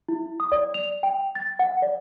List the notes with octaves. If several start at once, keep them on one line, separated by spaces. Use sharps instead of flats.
E4
D#6
D5
F7
G5
A6
F#5
D5